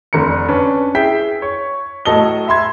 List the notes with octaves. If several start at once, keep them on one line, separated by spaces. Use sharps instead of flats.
F1 D3 A#5 C#7
C#4 D4 B4
E4 G#4 E5 G5 B6
C#5
A2 F#3 A4 D#5 G7
E5 B5 C6 G#6